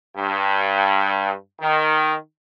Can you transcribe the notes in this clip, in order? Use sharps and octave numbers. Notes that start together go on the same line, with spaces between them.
G2
D#3